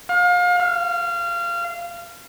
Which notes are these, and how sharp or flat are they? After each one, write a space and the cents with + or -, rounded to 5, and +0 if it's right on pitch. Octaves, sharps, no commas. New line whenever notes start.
F5 +30
F5 -25